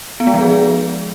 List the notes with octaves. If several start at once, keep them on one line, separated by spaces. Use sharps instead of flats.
B3
G#3
F3
G#4